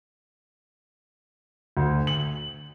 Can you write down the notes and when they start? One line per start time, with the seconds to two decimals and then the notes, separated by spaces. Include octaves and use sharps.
1.77 D2
2.07 F#7